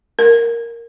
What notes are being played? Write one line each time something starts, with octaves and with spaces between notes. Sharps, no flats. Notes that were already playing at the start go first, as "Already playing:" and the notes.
A#4